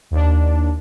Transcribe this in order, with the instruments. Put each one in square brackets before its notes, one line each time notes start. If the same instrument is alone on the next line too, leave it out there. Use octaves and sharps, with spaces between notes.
[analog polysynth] D#2 D4